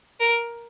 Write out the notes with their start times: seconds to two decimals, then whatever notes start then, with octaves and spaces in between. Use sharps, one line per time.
0.20 A#4